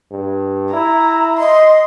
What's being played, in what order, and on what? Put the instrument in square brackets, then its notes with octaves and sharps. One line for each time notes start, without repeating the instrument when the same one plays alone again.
[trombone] G2
[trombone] E4 [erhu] A#5
[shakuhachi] D#5 [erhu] C6